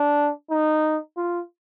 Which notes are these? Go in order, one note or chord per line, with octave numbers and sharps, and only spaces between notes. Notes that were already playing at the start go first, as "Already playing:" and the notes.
Already playing: D4
D#4
F4